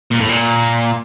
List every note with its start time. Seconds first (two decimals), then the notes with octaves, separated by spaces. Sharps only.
0.11 A#2
0.20 A2
0.29 A#2